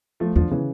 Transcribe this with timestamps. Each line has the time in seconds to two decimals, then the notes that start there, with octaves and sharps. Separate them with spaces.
0.20 F3 A3
0.36 E2 D3 F3
0.51 C#3 E3